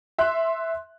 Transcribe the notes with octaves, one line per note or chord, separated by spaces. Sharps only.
E5 C6 F#6